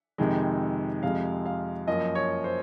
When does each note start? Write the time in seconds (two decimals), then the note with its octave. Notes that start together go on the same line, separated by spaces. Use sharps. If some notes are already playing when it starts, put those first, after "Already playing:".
0.18 F2 C3 D#3 G#3
1.03 F2 C3 F3 G#3 F5
1.46 F5
1.87 F#2 F3 A#3 D#5
2.15 C#5
2.44 C5